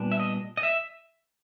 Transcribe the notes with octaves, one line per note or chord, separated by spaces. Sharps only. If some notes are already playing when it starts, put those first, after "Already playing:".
Already playing: A#2 G3 B3 D4
E5
D#5
D#5
E5